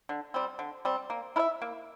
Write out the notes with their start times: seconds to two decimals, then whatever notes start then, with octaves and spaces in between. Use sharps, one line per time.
0.09 D3
0.34 G3 C4
0.59 D3
0.85 G3 C4
1.10 A#3
1.36 E4 A#4
1.39 E5
1.62 A#3